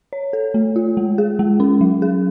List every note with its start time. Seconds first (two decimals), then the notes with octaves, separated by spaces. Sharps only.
0.13 C#5
0.33 A4
0.54 A3
0.76 F4
0.97 G#3
1.18 G#4
1.39 G#3
1.60 C#4
1.81 F#3
2.02 G#4